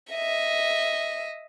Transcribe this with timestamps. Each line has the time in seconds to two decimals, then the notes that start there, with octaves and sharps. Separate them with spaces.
0.12 D#5 E5